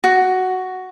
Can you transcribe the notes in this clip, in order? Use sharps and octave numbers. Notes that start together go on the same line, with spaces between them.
F#4